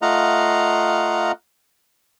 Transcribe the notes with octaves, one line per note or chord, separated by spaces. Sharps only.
A3 F4 D#5 F5 F#5 A#5